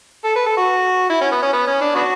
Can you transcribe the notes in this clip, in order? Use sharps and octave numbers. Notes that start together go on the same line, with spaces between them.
A4
B4
A4
F#4
E4
C#4
B3
C#4
B3
C#4
D4
B3 D4 F#4